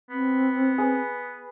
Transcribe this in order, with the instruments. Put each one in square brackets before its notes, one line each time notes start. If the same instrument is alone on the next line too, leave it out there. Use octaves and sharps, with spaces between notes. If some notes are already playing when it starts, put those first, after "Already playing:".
[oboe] B3 [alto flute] C4
[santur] G#4 B4